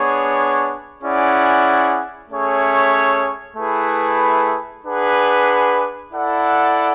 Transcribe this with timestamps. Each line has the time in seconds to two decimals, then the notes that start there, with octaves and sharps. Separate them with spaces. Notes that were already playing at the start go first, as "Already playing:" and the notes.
Already playing: B3 D4 G#4 C#5
1.02 C#4 E4 G#4 D5 F#5
2.29 A3 C#4 G#4 C#5 E5
3.56 A3 E4 G#4 B4
4.84 D4 G#4 B4 F#5
6.11 E4 A4 D5 F#5